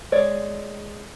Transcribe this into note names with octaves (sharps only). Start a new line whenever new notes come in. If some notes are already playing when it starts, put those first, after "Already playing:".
G#3 C#5 D5